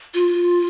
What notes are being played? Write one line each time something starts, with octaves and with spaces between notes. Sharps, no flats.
F4